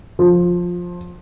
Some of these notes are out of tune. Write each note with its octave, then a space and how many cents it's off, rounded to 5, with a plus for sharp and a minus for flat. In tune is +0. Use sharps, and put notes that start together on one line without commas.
F3 +15